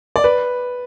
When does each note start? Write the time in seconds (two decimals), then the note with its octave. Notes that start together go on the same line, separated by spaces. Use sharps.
0.16 D5
0.24 B4